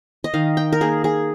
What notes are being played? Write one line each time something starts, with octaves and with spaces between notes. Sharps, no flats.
D#5
D#3 F5
G5
A#4
A#3 G#4
G#4